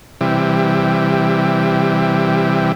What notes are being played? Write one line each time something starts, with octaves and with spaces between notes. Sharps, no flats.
C3 E3 G3